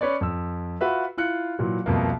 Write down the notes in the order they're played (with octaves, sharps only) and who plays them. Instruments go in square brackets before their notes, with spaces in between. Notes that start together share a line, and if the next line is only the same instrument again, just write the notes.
[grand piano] C#4 B4 C#5 D5
F2 E6
F4 F#4 B4 E5
E4 F4 F#6 C#7
A#2 E3 F#3
C2 F2 B2 A#3